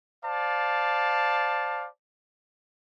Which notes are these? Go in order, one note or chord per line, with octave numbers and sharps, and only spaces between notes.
C5 D5 F5 A5